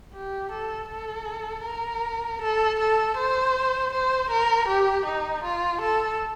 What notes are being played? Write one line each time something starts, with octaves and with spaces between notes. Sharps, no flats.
G4
A4
A4
A#4
A4
A4
C5
C5
A#4
G4
D#4
F4
A4